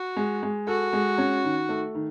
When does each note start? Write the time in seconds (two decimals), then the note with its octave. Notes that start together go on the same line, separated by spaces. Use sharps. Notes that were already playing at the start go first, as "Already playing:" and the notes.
Already playing: F#4
0.17 G#3
0.43 G#3
0.67 F#4 A4
0.93 G#3
1.18 C#4
1.44 D#3
1.69 A3
1.95 D#3